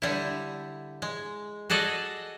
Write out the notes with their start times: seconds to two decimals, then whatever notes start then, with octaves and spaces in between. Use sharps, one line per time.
0.02 D3 G3 E4
1.02 G#3
1.70 F#4 G#4 A4 D5 D#5